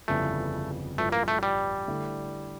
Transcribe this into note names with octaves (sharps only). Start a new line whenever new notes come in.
G1 F2 C#3 E3 G3 A3
A1 G2 F3 A3
A#3
A3
G3
D3 A3 E4 A4